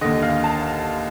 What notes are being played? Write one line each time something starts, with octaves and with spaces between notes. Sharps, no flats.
D#2 D3 D#5
F5
A5